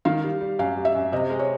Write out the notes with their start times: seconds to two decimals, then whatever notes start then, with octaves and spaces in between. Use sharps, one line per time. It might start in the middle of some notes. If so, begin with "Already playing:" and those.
0.05 D#3 F5
0.24 G3
0.41 G3
0.59 F#2 F5
0.77 G3
0.85 E5
0.95 F#2
1.12 C3 D#5
1.30 G#3
1.39 C#5